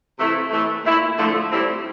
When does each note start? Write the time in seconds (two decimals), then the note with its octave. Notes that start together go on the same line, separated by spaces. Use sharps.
0.18 C3 E3 A3 E4
0.51 A2 E3 A3
0.84 A#2 A3 E4
1.17 D3 F3 A3
1.50 A2 G3 C4 E4